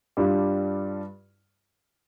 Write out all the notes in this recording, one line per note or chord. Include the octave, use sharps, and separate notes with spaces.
G2 G3 D4 F4